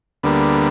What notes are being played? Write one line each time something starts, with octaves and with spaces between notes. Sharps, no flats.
D2 D3 G3 A#3 B3